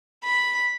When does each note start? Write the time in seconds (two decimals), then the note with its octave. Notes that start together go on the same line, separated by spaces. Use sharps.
0.24 B5